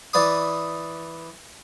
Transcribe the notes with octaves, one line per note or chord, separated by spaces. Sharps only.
E3 D5 B5 D#6